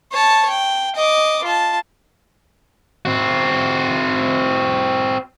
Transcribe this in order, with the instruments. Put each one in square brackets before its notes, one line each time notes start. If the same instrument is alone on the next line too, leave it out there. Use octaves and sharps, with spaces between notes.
[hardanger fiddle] C#5 A5
G5
D#5 D6
F4 A5
[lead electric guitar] C4 F#4